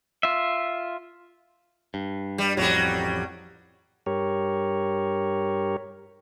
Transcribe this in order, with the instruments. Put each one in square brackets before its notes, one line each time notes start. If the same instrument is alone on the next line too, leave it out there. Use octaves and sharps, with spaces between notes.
[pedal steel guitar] F4 E5
[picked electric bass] G2
[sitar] G3
[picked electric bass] A1 F2 A2 [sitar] F#3 G3
[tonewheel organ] G2 G4 A#4 C#5